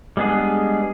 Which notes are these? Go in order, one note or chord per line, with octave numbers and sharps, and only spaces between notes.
G3 G#3 B3 D4 G#4